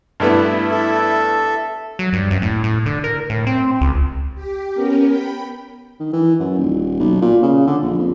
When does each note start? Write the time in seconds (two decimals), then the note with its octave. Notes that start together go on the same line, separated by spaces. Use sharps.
0.20 G2 A3 B3 E4
0.71 A4 E5
1.99 F#3
2.13 G2
2.31 F#2
2.42 A2
2.64 A2
2.86 D3
3.04 A#4
3.30 A2
3.47 C4
3.81 C#2
4.35 G4
4.75 B3 C#4 A#4
5.07 G5 B5
6.00 D#3
6.13 E3
6.40 F#2
6.58 D#1
6.99 B1
7.22 A#2
7.43 C#3
7.67 D3
7.82 A#1
7.98 F2